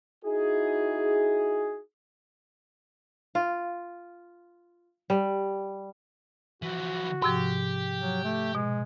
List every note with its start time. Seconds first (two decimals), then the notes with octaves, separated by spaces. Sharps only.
0.25 D#4 E4 F#4 G#4
3.35 F4
5.10 G3
6.62 E3 F3 F#4
7.22 G#2 C3 F3 G4
7.99 F#3
8.24 A3
8.55 B2 G#3